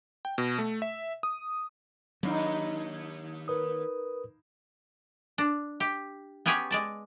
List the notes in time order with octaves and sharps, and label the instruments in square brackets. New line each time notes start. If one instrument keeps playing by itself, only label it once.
[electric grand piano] G5
B2
A3
E5
D#6
[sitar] D#2 [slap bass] F#3 C4 D4 [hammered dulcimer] D#4 F5 B5
[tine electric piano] A#4 B4 D#6
[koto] D4
G4
B3 C#4 G4 G#4 C#5
G#3 D5 A5